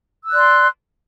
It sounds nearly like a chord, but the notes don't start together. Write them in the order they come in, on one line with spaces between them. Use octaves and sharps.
E6 F#6 D5 C6